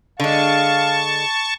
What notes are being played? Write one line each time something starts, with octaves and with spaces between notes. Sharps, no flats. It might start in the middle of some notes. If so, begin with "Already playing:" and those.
D3 G#3 F5 A5 C#6